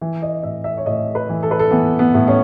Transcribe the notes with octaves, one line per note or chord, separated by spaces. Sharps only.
E3
D#5
A2 E5
E5
C#5
A2 D#5
B4
E3
A4
B4
A4
E3 B3
B3
A2
C#4